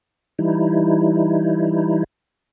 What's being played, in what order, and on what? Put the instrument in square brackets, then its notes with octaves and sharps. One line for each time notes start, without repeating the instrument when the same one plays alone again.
[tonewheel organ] E3 G3 D#4 E4